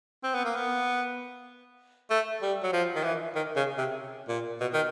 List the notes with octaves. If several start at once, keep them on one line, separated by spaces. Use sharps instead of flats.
C4
B3
A#3
B3
A3
G3
F#3
F3
D#3
E3
D#3
C#3
C3
A#2
B2
D#3